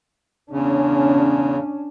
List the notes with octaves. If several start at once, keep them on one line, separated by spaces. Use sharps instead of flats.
E2 C#3 C#4 D4